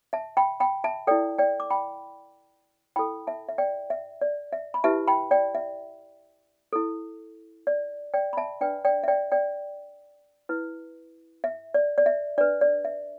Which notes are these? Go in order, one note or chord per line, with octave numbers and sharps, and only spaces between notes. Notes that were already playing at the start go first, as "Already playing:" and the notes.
E5 A5
G5 B5
G5 B5
E5 A5
E4 A4 D5 G5
D5 G5
D6
G5 B5
E4 A4 G5 B5
E5 A5
E5
D5 G5
E5
D5
E5
B5
E4 G4 B4 E5 A5
G5 B5
D5 G5
E5
E4 A4
D5
D5 G5
B5
E5 A5
D4 B4 D5 G5
D5 G5
E5
D5 G5
D5 G5
E4 B4
E5
D5
D5
E5
D4 B4 D5
D5
E5